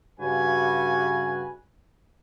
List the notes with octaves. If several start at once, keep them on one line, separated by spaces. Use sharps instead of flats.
G2 C#3 G3 F#4 B4 G#5